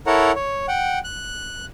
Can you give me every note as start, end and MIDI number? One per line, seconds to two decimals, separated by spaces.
0.07 0.32 64
0.07 0.32 69
0.07 0.32 70
0.07 0.32 73
0.07 0.32 78
0.07 0.32 82
0.36 0.66 73
0.68 0.99 78
0.68 0.99 79
1.04 1.65 90